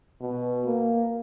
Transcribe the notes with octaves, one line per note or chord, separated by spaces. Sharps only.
B2
A#3